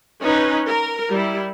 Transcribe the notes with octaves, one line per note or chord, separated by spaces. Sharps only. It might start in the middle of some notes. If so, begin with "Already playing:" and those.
C#4 D#4 B4
A#4
G3 E4